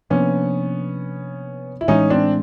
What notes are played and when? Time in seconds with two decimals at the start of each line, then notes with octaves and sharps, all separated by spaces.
0.10 C3 F3 A#3 B3 C#4 D4
1.81 E4
1.88 A2 E3 G#3 C#4 D#4
2.10 C4 D4